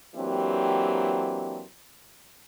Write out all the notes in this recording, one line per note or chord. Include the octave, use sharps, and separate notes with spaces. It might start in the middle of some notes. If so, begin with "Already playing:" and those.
E3 F#3 A#3 C4 D4 G4